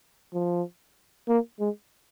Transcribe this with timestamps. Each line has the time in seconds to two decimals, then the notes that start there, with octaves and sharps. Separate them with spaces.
0.34 F3
1.28 A#3
1.60 G#3